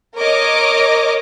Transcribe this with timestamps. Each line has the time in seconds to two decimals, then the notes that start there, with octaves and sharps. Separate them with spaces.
0.17 A#4 C#5 D#5 D6